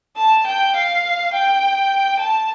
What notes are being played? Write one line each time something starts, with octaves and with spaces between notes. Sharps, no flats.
A5
G5
F5
G5
A5